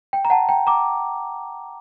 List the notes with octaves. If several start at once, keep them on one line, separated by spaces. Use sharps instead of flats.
G5
A#5
F#5 A5
G5 A#5
A#5 D6